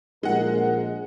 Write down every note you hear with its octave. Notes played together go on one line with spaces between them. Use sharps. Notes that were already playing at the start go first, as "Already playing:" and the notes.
A#1 G#3 A#4 F#5